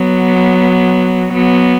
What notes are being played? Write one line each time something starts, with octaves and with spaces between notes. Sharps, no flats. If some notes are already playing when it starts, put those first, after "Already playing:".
Already playing: F#3 B3
F#3 B3